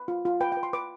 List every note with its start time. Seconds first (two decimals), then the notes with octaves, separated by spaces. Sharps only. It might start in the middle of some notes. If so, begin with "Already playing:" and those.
Already playing: B4
0.08 F4
0.25 F4
0.41 B4 G5
0.52 G5
0.57 B4
0.63 C6
0.73 B4 D6